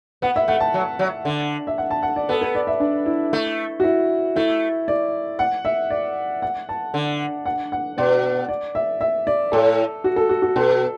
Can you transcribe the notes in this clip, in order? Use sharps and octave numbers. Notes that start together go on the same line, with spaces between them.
B3 F#5
E5
A3 F#5
A5
F#3
F#3
D3
E5
F#5
A5
F#5
D5
B3 A4
B4
D5
E5
D4
E4
A3
F#4
E4
A3 E4
D5
F#5
E5
D5
F#5
A5
D3
F#5
F#5
B2 D5
D5
E5
E5
D5
A2 A4
F#4
A4
F#4
F#4
B2 A4